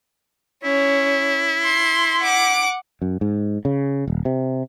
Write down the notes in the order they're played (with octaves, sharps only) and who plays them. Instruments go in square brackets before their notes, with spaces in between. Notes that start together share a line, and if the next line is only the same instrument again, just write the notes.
[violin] C#4 [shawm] E4
[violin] C6
F#5 D6
[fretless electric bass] F#2
G#2
C#3
D#1
C3